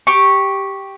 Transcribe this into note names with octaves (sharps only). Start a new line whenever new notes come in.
G4 C#6